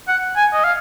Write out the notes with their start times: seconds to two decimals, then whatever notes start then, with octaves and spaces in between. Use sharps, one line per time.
0.08 F#5
0.36 G#5
0.53 D#5
0.64 F5